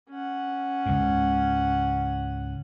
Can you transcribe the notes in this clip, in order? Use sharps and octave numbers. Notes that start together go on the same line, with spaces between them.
C#4 F#5
C#2 G#2